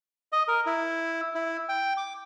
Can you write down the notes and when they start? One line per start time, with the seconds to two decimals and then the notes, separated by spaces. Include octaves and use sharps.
0.32 D#5
0.48 A#4
0.66 E4
1.35 E4
1.69 G5
1.97 D6